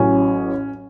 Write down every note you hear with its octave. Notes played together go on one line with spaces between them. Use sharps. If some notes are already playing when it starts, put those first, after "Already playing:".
Already playing: A1 A2 F#3 C#4